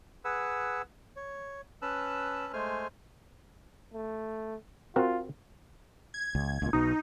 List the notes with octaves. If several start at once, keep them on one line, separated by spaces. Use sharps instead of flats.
G#4 B4 F#5 E6
C#5
C#4 B4 A5 E6 F#6
G#3 A3 C5 G#5 F6
A3
C4 F4 F#4 A#4
G#6
C#2
C#2 A#2
B1 B2 D#4